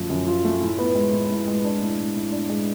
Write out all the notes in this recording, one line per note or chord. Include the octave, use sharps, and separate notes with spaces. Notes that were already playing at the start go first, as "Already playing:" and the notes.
Already playing: F#2 F3 A3
F#2
F4
A3
A2
B3
G#3
A2
A2
G#3
D4
A2
A2
A2
D4
G#3